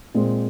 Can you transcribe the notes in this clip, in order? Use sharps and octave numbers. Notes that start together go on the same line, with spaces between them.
A#2 G#3 C4